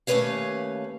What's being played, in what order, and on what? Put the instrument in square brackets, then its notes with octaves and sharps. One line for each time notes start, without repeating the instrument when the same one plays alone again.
[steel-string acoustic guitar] D#2 A3 C#4 B4 C#5 F5